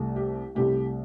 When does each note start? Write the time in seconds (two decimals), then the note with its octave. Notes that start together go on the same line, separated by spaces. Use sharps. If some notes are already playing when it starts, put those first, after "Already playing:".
Already playing: C2 C3 A3
0.16 G4
0.55 C2 C3 A3 G4